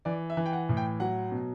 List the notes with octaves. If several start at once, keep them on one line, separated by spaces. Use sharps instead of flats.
E3 D5
E5
E3
G5
F#5
A2
G5
F#3 F#5
B2